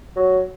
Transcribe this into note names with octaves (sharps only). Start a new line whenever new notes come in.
F#3